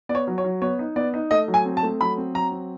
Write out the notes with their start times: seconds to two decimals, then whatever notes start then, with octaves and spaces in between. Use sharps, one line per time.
0.09 B3 D5
0.15 C#5
0.27 F#3
0.38 C#5
0.44 F#3
0.62 B3 C#5
0.79 D#4
0.96 B3 D5
1.14 D#4
1.31 A3 D#5
1.48 F#3
1.54 G#5
1.65 C4
1.77 A5
1.83 A3
2.01 F#3 B5
2.17 C4
2.34 F#3 A#5
2.52 C4